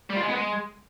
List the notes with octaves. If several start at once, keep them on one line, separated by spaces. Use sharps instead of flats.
G3
F4
G#3
B3
G#3